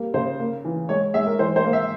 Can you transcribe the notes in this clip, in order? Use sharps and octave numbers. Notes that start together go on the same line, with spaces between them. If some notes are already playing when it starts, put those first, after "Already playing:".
Already playing: G3 A#3
C#3 C5
A#3
E3
G#3 C#5
G#3 E5
A#4
E3 C5
C5
A#3
E5